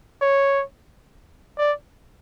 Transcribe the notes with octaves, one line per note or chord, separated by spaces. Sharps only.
C#5
D5